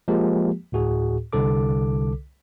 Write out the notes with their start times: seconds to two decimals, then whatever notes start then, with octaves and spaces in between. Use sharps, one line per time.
0.08 F3 G#3 A#3 G4
0.72 D2 A2 F#4 G#4
1.33 C2 D3 A4 D6